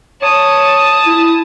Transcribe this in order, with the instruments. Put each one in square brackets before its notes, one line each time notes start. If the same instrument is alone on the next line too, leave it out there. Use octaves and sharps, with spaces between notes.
[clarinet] C#5 [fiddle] A5 D#6
[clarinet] E4